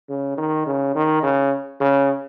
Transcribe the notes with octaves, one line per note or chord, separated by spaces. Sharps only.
C#3
D#3
C#3
D#3
C#3
C#3